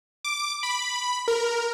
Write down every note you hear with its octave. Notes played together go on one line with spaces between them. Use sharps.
D6
B5
A#4